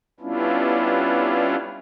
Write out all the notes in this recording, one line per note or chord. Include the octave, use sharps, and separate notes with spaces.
G3 B3 C#4 D4 E4 F4